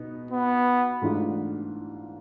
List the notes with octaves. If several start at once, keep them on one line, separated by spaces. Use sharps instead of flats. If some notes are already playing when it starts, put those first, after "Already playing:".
Already playing: B2 B3 D#4
B3
G#2 E3 A3 D4 F4